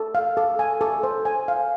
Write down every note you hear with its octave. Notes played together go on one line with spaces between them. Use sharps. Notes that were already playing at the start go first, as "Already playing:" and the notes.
Already playing: A4
F5
A4
G#5
A4
C5
G#5
F5